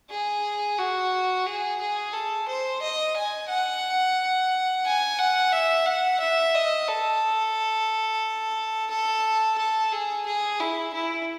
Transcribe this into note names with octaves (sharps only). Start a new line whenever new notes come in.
G#4
F#4
G#4
G#4
A4
C5
D#5
G#5
F#5
G#5
F#5
E5
F#5
E5
D#5
A4
A4
A4
G#4
G#4
E4
E4